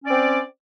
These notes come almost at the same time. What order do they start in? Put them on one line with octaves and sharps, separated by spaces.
C#4 D5 C4